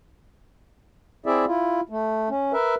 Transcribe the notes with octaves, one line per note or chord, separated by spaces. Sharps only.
C4 E4 G#4 D5 E5
E4 F4
A3
C#4
A#4 B4 E5